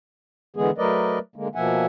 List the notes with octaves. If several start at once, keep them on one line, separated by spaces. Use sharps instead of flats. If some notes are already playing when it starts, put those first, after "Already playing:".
D3 E3 G#3 B3 G#4
F#3 A3 A#4 B4 D5 D#5
D3 G#3 A#3
B2 F3 A#3 E5 F#5 G#5